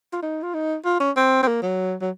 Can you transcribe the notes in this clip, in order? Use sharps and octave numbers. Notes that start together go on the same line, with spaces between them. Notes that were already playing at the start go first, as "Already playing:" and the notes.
F4
D#4
F4
D#4
F4
C#4
C4
C4
A#3
F#3
F#3